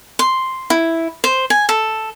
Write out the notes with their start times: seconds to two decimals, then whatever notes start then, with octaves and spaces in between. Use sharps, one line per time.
0.19 C6
0.70 E4
1.24 C5
1.50 G#5
1.69 A4